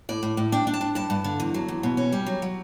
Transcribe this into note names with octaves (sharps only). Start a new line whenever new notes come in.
A2 D5
A2
A2
D4 G5
D4
A5
D4
G2 A5
G2
D3
E2
F#3
E2
B2
C#4
G3
F#3
F#3